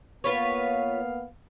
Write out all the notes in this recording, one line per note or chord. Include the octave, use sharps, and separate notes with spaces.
A#3 B3 F4 B4 C#5 F5